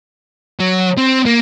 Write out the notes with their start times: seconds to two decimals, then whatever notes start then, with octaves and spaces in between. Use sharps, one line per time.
0.60 F#3
0.98 C4
1.26 A#3